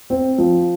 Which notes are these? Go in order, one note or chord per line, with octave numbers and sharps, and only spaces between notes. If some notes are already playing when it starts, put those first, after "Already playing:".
C4
F3